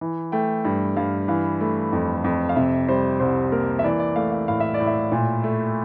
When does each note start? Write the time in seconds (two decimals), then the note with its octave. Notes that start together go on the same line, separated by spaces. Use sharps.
0.01 E3
0.32 A3 G5
0.65 G2
0.97 G2 F5
1.28 E3 F5
1.61 A3
1.93 F2
2.24 F2
2.49 F5
2.56 C3 E5
2.88 G3 C5
3.20 C2 C5
3.52 A#3 A#4
3.79 E5
3.84 E3 D5
3.99 D5
4.16 A3 F5
4.32 F5
4.48 A2 F5
4.60 E5
4.74 D5
4.80 A2
4.87 E5
5.12 A#2
5.44 A3